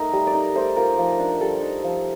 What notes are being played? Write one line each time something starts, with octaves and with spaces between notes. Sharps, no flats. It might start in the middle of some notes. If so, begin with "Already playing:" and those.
Already playing: A3 D#4 A#4
G3
D5
D#4
A3 C5
F4 A#4
F3
D4
G3 A4
D#4
F3